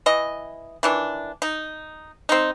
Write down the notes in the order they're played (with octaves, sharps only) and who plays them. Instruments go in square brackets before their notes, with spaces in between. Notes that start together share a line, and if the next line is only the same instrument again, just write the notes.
[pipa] E3 D#5
D#3 E3 D4
D#4
C4 D#4